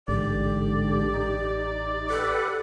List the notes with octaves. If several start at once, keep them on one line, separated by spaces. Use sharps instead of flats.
A1 G#2 D3 G4 D5
D#4
G4 A4 B4 F#5